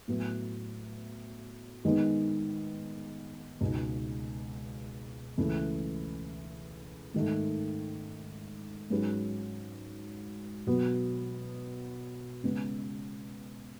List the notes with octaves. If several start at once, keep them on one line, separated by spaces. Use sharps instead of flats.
A2 F#3 B3
D#3 G#3 B3 D#4 G#4
C#2 B2 G#3 D#4
C#2 C#3 E3 A3 E4
G#2 D#3 A3
G#2 F#3 C#4 G#4 B4
B2 F#3 B3
C#3 G#3 B3